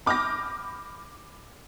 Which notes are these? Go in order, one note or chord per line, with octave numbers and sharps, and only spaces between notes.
B5 D6 D#6 F6 G6 A#6